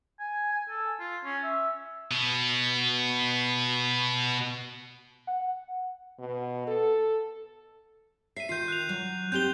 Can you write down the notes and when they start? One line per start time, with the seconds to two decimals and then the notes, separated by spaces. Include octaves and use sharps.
0.19 G#5
0.53 G#5
0.69 A4
1.00 F4
1.25 C#4
1.43 E5
2.11 B2 B3
5.27 F#5
6.19 B2
6.68 A4
8.37 E5 C7 D#7
8.49 D#3 F4 G6 C7
8.68 F#6 F7
8.89 F#3
9.32 C4 D#4 G4 G6 F7 G7